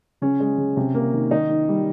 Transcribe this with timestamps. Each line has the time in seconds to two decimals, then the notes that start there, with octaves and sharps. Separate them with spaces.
0.22 C#3 C#4
0.40 G#3
0.58 C#3
0.77 C3
0.94 A#3
1.13 D#3
1.31 D#3 D#4
1.50 D#3
1.69 G3